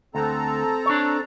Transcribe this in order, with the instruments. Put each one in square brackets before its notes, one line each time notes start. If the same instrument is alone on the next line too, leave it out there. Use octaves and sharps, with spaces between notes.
[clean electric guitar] D2 [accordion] C4 A4 A#5
[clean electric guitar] D4 C#5